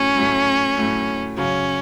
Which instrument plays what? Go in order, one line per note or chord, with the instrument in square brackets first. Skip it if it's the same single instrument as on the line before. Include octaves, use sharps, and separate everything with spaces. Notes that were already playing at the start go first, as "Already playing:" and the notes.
Already playing: [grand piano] A2 F#3 A3 [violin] C#4
[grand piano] A2 F#3 A3
A2 F#3 A3
[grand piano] F#2 C#3 F#3 [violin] C#4